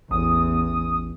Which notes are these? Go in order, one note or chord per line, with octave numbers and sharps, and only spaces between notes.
A1 E2 D#6